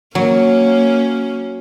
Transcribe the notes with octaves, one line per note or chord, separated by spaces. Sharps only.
F#3 A#3 C#4